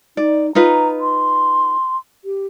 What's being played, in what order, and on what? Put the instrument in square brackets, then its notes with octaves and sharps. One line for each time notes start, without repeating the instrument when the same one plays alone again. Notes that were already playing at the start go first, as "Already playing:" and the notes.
[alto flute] D#4 [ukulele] D5
[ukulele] D#4 F4 B4 [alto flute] A#5
[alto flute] C6
G4